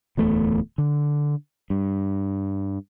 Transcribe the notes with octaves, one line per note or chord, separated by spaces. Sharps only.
D1 E2 A3
D3
G2